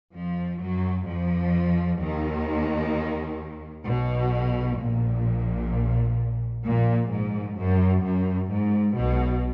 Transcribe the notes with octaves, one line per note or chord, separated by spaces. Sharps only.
F2 F3
F#2 F#3
F2 F3
D#2 D#3
B1 B2
A#1 A#2
A#1 A#2
G#2
F#2
F#2
G#2
B1 B2